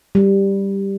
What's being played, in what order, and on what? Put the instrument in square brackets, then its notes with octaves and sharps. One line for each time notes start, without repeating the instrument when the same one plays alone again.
[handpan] G3